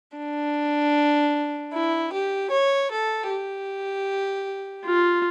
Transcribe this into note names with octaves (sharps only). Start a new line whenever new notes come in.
D4
E4
G4
C#5
A4
G4
F4